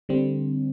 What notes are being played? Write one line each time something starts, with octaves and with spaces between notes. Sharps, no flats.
D3 G3 C4